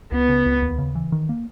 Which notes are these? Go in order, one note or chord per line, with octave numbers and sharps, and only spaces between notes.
C#2 B3
C#3
C#2
D#2
C#3
E3
D#3
A#3